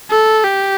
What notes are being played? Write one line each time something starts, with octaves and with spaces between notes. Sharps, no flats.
A4
G4